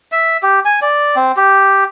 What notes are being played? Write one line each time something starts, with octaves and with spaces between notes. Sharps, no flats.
E5
G4
G#5
D5
C4
G4